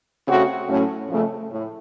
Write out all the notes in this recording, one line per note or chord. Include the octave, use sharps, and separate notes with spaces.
C#3 A3 C4 F#4
A2 F#3 A3 C#4
F2 C#3 A3
A2